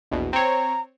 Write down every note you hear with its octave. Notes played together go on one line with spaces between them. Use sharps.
A#1 E2 B2
C4 C#5 A#5